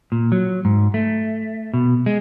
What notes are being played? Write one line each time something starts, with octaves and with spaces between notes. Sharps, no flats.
A#2
F#3
G#2
A3
B2
G#3